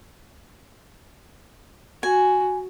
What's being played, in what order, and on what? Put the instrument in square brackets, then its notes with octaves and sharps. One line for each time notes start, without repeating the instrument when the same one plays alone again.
[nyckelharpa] F#4 [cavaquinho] G#5